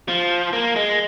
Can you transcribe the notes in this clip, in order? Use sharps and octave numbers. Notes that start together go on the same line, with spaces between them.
F3
A#3
G#3